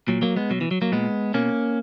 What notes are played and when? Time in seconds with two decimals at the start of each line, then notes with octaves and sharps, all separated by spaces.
0.08 A#2 F#3
0.22 F#3 A#3
0.36 G#3 B3
0.50 B2 F#3
0.61 E3
0.71 F#3
0.82 F#3 A#3
0.92 A#2 G#3 B3
1.34 B2 A#3 C#4